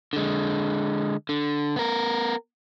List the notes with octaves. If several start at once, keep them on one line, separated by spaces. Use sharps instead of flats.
D3 G#3
D3
B3 A#4